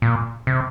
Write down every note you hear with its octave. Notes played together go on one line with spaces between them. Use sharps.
A#2
C3